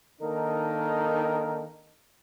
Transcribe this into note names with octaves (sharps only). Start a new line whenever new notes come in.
D#3 A#3 D4 D#4 A4 A#4